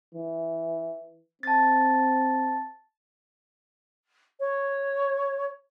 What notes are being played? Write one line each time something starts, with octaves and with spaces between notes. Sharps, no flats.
E3
C4 A5 A6
C#5